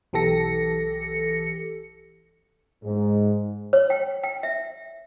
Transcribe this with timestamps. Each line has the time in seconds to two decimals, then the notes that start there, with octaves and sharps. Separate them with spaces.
0.13 B1 E3 G4 A4 A#6 C#7
2.84 G#2
3.73 C#5
3.90 G5
4.23 G5
4.43 E5